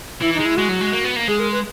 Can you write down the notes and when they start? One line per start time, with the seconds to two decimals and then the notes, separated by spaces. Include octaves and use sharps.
0.22 E3 E4
0.34 D#4
0.40 G#3 E4
0.57 G#3 F#4
0.69 F#3
0.81 G#3
0.93 A#3
1.04 B3
1.16 A#3
1.28 G#3 G#4
1.40 A#4
1.52 B4